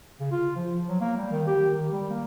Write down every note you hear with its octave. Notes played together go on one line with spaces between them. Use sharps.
C#3
F4
F3
F#3
A#3
G3
D#3
G4
D#3
G3
A#3